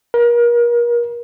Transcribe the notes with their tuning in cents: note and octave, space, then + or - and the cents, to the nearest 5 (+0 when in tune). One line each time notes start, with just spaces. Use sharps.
A#4 +35